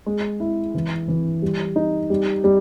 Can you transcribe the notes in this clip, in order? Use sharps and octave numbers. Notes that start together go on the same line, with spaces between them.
G#3
E4
E3
E3
G3
D#4
G3
G3